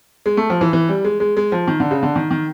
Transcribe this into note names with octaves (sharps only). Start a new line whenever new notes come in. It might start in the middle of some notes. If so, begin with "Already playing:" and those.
G#3
A3
F3
E3
E3
G3
G#3
G#3
G#3
F3
D#3
D3
C#3
D3
D#3
D#3